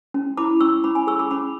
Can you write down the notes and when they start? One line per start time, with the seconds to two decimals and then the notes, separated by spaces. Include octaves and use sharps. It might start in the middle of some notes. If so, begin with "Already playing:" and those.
0.14 C#4
0.37 E4 B5 D6
0.61 C#4 C#6 E6
0.84 C#4 B5 D6
0.95 G#5 B5
1.07 G#4 C#6 E6
1.19 B5 D6
1.31 C#4 B5 D6